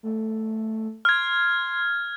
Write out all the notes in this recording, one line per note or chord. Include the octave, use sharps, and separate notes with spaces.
A3
C6 F6 G#6